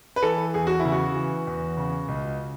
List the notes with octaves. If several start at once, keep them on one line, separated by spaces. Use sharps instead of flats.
B4
E3 A4
E2 G#4
F#4
E4
C#3
F#4
E3
E2
C#3
C#2